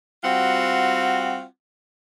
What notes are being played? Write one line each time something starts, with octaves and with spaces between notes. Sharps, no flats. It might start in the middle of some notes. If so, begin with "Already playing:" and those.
G3 C4 F4 F#4 F#5